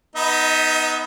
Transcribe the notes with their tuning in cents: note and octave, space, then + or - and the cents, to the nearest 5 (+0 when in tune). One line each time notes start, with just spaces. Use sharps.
B3 +0 D#4 +5 D#5 +40